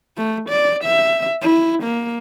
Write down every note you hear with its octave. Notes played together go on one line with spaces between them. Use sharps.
A3
D5
E5
E4
A#3